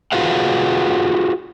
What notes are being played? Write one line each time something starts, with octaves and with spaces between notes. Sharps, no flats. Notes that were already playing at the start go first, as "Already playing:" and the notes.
F4 F#4 G#4 B4 F5 F#5